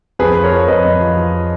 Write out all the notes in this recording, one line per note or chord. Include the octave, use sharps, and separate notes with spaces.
F2 G#4 B4
F3
A#4 C#5
F3
F2 B4 D#5
F2
F3
F3